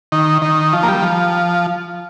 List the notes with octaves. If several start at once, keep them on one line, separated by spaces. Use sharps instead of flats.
D#3
D#3
F3
A#3
G3
F3